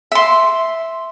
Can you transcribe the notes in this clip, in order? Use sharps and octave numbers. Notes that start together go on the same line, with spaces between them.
E5 C6